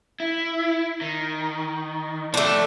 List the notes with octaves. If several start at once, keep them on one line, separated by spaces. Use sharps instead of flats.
E4
D#3
F3 A3 D4 G4